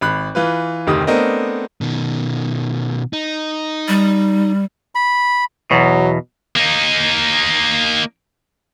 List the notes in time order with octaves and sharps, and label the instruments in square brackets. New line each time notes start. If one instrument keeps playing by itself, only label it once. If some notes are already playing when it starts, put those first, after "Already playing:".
[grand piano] G#1 B5 F#6
E3 F4 B4
F1 D2 C3 D#3 D#4 D#6
A3 B3 C4 D4 A#4 D#5
[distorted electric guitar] B2 D#3
D#4
[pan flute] G3
[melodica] B5
[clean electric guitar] E2 B2 [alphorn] F#3
[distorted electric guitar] A#3 D#4